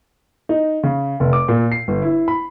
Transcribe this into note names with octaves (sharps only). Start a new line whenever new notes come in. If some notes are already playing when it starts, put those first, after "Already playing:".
D#4
C#3
F1
D6
A#2
C7
G1
E4
B5